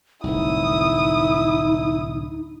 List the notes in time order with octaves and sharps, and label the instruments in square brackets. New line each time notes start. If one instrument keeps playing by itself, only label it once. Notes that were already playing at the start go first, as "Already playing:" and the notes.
[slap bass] D1 C2 [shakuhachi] D#4 [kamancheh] E4 D#6